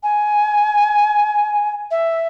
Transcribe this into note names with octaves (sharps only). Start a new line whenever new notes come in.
G#5
E5